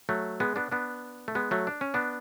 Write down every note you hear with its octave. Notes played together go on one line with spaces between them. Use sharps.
F#3 A3
G#3 B3
B3 D4
B3 D4
A3
G#3 B3
F#3 A3
D4
C#4
B3 D4